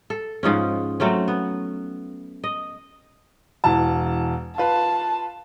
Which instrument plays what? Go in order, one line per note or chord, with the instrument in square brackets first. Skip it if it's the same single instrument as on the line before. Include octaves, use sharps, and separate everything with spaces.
[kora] A4
G#2 F3 G#3 C#4
F#3 A3 C4 C#4
B3
D#5
[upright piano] E1 E3 A5
[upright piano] F4 B4 [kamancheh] A5